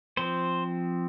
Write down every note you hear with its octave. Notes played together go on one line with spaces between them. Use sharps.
F3 C4 C5